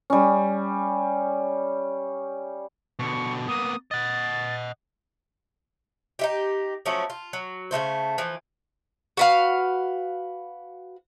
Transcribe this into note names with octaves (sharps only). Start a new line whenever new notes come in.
G3 C#4
B2 D3 C#6
A#3 B3 D#6
D#5 F#5 A6
D#4 E4 G4
F3 F#3 A3 C#4
F4
F#3
C#3 F#3 A3 C5
E3 F3
F#4 B4 F5